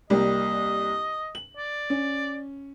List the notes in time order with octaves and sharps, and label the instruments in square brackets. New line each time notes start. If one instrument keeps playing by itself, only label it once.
[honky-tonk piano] C2 G3 A#3 [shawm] D#5
[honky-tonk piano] F#7
[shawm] D5
[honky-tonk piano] C#4